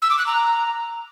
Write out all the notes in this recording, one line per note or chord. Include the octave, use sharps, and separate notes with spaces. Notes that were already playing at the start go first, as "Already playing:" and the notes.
E6
D6
F#6
A#5